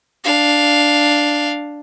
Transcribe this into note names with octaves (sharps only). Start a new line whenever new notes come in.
D4 F5